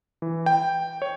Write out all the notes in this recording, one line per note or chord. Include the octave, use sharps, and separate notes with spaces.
E3
G5
C#5